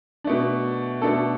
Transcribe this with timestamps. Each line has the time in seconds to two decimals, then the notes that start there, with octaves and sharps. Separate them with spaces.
0.24 B2 A3 D4
1.02 B2 A3 D4 A4